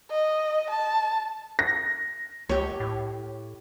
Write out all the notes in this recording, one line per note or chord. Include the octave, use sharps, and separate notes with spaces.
D#5
A5
A#6
C#2 G4 C#5
A2